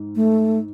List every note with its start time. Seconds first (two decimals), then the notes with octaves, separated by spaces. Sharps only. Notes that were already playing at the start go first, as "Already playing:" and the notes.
Already playing: G#2
0.15 A3